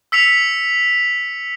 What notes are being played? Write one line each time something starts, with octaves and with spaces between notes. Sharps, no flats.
E6 B6 C#7 F7